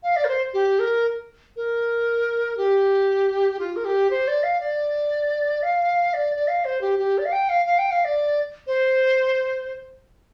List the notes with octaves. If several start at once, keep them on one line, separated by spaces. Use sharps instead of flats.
F5
D5
A#4
C5
G4
A#4
A#4
G4
F4
A#4
G4
C5
D5
F5
D5
F5
D5
D5
F5
C5
G4
G4
D5
F5
G5
F5
F5
G5
F5
D5
C5